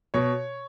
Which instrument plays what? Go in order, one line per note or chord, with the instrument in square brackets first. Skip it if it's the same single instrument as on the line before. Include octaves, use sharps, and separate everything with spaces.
[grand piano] B2 C#5